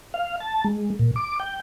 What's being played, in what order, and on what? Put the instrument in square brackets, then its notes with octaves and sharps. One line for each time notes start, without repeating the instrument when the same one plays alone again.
[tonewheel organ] F5
A5
G#3
A#2
D6
G5